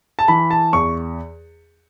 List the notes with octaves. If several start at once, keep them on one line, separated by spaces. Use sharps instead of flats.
A5
E3 B5
A5
E2 C#6